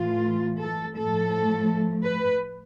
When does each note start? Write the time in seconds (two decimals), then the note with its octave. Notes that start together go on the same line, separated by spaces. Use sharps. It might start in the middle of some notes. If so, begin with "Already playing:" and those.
Already playing: A2 E3 A3 F4
0.61 A4
0.97 A2 F3 A3 A4
2.05 B4